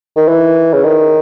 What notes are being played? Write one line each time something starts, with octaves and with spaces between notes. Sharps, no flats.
D#3
E3
C#3
D#3